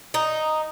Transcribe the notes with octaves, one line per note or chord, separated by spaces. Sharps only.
D#4